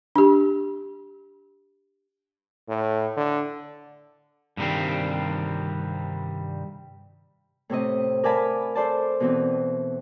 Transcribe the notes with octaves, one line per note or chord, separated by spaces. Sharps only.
D4 G4
A2
D3
G2 C3 D#3 G3 C4
A2 C3 C4 D#5
A#4 D5 F5 G#5 A5 B5
A4 C5 D5 A5
B2 E3 C4